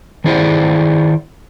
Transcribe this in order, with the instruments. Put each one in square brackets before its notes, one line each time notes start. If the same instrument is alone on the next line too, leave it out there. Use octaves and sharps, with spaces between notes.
[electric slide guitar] D#3 D4 E4 G#4 C5 D5